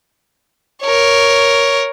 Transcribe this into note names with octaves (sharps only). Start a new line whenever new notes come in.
A#4 C#5